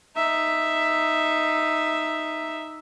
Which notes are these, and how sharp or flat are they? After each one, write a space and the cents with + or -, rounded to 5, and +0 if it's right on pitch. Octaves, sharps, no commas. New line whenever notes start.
D#4 +0 E5 +0